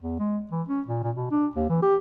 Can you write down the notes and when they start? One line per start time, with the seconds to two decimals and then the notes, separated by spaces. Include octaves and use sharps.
0.01 E2
0.20 G#3
0.51 E3
0.69 C#4
0.87 A#2
1.03 A#2
1.15 B2
1.31 D4
1.55 D#2
1.70 E3
1.82 G4